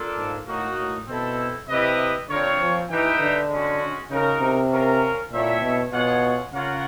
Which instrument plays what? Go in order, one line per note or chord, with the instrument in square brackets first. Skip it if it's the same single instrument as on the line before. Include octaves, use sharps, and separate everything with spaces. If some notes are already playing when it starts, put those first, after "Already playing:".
Already playing: [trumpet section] A#3 D4 F4 A4
[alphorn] G#2
[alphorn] A2 [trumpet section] A#3 D#4 F#4
[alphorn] A2
[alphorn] B2 [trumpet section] C4 E4 A4
[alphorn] C3 [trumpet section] E4 G4 B4 D#5
[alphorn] D3 [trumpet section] C4 F4 A#4 C#5
[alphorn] F3
[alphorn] E3 [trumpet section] D#4 G4 B4 E5 G5
[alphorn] D3
[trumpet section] G#3 C#4 F#4
[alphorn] C#3 [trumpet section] D#4 F#4 A#4
[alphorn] C3
[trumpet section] C#4 F4 A#4
[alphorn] A#2 [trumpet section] C4 E4 A4 C#5 E5
[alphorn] B2
[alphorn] B2 [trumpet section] F4 G#4 C#5 F#5
[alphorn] C#3 [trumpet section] F4 A#4 C#5 F#5